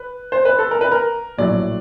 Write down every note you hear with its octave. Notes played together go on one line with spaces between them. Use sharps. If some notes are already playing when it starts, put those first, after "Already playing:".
Already playing: B4
C5
B4
A4
A#4
B4
A#4
A#1 A2 F#3 A3 D5